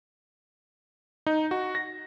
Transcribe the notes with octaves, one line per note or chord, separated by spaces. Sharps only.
D#4
F#4
A#6